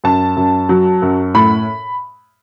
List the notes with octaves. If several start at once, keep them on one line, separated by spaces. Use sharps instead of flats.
F#2 A5
F#2
F#3
F#2
A2 B5